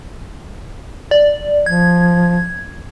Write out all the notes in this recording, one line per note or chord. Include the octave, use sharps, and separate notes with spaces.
D5
F3 G#6